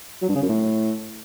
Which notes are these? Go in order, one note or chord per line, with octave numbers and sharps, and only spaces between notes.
F#3
G2
C#3
F#2
A2